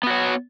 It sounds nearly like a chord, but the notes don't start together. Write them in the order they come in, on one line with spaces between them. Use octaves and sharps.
B3 F#4 C#5